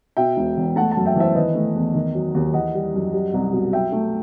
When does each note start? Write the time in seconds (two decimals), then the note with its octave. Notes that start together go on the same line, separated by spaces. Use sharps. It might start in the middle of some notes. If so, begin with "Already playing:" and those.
0.17 B2 E5 G5
0.37 E1
0.57 E2
0.76 A3 F#5 A5
0.91 F#5 A5
0.97 F#2
1.06 E5 G5
1.16 E3 C5 E5
1.35 D#3 B4 D#5
1.55 A3
1.75 E2
1.94 D#3
2.15 F#3
2.35 D#2
2.54 E3 D#5 F#5
2.75 G3
2.94 F#2
3.14 G3
3.34 C2
3.52 B2
3.73 F#3 E5 G5
3.92 A3